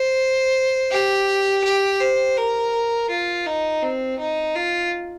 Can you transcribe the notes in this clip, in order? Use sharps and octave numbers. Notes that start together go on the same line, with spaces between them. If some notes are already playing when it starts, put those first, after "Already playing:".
Already playing: C5
G4
G4
C5
A#4
F4
D#4
C4
D#4
F4